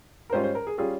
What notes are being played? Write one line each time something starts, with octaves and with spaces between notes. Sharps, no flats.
A#4
G#2 G3 C#4 F4 C5
C5
A#4
G#4
G3 C#4 F4 G#4